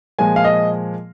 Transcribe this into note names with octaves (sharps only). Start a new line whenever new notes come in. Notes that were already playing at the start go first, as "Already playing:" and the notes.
A#2 F3 G#3 G#5
F5
D#5